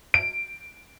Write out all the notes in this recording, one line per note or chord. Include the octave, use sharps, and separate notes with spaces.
D7